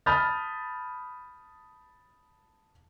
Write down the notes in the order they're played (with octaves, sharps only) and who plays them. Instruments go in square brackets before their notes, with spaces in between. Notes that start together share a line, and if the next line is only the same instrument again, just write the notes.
[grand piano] A5 B5 D#6 F6 G6 A6